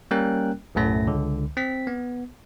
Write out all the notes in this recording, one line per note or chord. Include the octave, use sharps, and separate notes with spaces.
G3 A#3 C#4 A#4 G5 F#6
B1 F#2 A2 A3 A#6
C#2 D3
C4 B6
B3